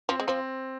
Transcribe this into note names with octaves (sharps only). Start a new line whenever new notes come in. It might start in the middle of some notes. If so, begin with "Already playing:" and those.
F3 C4
G#3
F3 C4